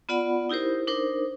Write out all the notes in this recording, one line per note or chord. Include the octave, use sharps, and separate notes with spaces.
B3 F4 D5 F#5 B5
D#4 E4 G4 A#4 C5
D4 D#4 A#4 C5